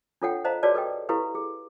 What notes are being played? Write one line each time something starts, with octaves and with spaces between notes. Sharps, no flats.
D4 F4 A4 C#5 F#5 G5
C5 D#5 F5 A5 A#5
F#4 G#4 B4 C#5 D5 A5
A4 B4 D#5 G5
E4 G4 A4 B4 F5
G#4